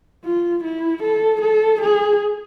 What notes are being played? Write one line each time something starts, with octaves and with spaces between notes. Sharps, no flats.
F4
E4
A4
A4
G#4